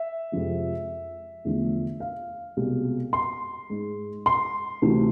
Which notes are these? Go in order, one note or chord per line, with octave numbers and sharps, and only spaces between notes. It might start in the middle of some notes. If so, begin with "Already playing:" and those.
Already playing: E5
F2 C3 F3 G#3
E2 D3 F3 A3
F5
C2 B2 G#3
C6
G#2 G#3
C6
D2 C3 E3 A3